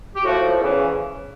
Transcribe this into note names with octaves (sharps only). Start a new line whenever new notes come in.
G4
A2 F3 F#4
E2 C#3 E3